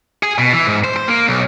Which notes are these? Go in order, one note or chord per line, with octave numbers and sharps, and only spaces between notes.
G#4
B2
E3
G#2
C5
C5
A#3
B1